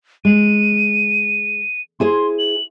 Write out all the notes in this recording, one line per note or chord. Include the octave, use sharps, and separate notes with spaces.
G#3 D#7
E4 G#4 C5 C6
F#7